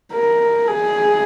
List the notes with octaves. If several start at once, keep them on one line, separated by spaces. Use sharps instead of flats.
A#4
G#4